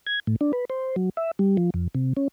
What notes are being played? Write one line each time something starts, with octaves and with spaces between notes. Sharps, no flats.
G#6
A2
D4
B4
C5
F#3
E5
G3
F3
F2
C3
C#4